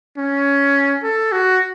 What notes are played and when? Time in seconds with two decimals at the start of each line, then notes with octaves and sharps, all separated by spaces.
0.17 C#4
1.03 A4
1.32 F#4